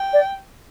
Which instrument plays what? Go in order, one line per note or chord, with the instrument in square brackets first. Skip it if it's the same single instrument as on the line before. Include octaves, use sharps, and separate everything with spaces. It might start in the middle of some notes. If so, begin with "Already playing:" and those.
Already playing: [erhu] G5
[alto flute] D5